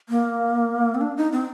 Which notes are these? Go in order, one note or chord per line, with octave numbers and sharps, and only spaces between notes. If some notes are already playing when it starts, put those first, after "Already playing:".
A#3
C4
D4
D#4
C4